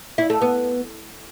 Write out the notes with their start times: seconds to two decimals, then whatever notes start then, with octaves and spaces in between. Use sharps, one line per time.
0.18 E4
0.30 A3
0.41 B3